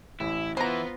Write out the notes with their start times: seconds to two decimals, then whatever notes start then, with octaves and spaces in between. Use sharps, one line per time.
0.20 A1 E4
0.57 E3 B3 F4 C5 A#5 B5 A#6